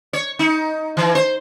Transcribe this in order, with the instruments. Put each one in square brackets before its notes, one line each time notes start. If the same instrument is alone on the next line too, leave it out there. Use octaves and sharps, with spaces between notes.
[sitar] C#5
D#4
E3
C5